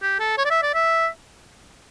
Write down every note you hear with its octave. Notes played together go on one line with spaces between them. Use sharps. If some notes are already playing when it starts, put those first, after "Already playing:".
G4
A4
C#5
D5
E5
D5
E5